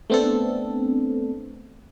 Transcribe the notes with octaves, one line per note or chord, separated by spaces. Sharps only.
A3 B3 C4 D4 A4